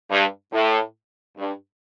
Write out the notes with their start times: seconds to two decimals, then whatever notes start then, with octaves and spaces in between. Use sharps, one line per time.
0.10 G2
0.53 A2
1.37 G2